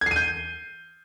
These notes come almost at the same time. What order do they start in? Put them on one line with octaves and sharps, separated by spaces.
G#6 C7 D#7 G6